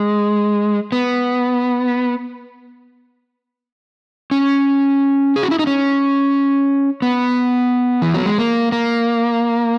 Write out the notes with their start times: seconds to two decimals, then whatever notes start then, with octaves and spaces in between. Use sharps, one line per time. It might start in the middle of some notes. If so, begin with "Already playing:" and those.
Already playing: G#3
0.92 B3
4.31 C#4
5.36 G#4
5.43 F#4
5.51 E4
5.59 D#4
5.67 C#4
7.02 B3
8.02 E3
8.14 F#3
8.26 G#3
8.38 A#3
8.72 A#3